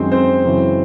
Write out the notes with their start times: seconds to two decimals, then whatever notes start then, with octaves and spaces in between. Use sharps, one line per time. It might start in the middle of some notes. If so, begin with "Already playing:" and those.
Already playing: F#2 D#3 G#3 C4 C5
0.12 C4 C5
0.44 F#2 C#3 E3 G#3